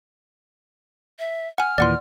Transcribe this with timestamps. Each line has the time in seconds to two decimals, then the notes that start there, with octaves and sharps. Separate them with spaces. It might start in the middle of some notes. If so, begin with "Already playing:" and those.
1.19 E5
1.58 F#5 G#5 F6
1.78 D#2 A#2 E3 D5 F#5 C6